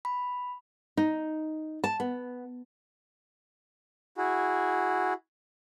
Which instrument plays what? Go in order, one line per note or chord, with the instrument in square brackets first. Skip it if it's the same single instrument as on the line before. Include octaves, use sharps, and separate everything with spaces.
[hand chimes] B5
[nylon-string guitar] D#4
A5
B3
[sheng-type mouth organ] E4 F#4 G#4